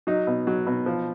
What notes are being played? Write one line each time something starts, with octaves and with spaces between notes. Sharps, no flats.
F#3 D#4
B2
F#3
B2
F3